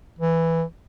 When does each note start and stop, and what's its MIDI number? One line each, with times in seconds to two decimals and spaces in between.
0.19 0.63 52